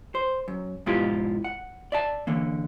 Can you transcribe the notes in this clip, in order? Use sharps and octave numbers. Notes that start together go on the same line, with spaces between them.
C5
F#2
G#2 B2 F3 E4 F4 G4
F#5
D5 E5 A5
D3 E3 A#3